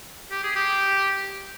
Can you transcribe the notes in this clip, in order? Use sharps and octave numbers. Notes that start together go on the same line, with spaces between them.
G4
G#4
G4